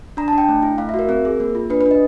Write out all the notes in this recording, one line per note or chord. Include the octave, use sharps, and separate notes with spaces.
D4 A#5
A5
D4
G5
A3
E4
A3 F5
E5
F#4 A#4
C4 A#4
G#4
A#3
F4
D4 B4
B4
D4
D#5